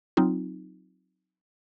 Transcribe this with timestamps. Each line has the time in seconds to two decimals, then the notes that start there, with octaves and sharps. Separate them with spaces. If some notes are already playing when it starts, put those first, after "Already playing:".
0.17 F#3 C4 D#4 F4